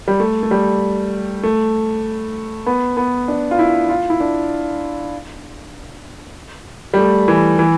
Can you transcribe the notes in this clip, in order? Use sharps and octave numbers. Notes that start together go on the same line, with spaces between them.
G3
A3
A3
G3
A3
B3
B3
D4
F4
E4
F4
E4
D4
G3
A3
E3
E3